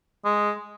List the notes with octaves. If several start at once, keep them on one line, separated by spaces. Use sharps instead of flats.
G#3